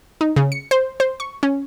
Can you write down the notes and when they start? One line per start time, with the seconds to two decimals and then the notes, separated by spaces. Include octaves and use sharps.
0.21 D#4
0.36 C#3
0.52 C#7
0.71 C5
1.00 C5
1.20 C#6
1.43 C#4